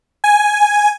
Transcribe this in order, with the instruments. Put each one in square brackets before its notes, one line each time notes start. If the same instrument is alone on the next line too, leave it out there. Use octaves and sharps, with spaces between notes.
[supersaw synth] G#5